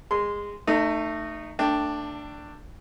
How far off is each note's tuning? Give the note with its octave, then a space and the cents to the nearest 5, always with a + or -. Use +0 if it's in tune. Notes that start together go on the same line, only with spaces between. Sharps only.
G#3 -20 C6 -15
A3 +20 D#4 -20
A3 +30 D4 +5 G5 +0